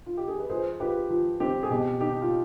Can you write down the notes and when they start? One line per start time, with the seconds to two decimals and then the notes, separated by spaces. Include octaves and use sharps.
0.06 F4
0.17 G4
0.28 G#4
0.39 B4
0.50 F3 G#4 C5
0.80 F4 G4 B4
1.10 F3
1.40 C4 G4
1.63 G#4
1.70 B2 G4
2.01 D#4 G4
2.22 F4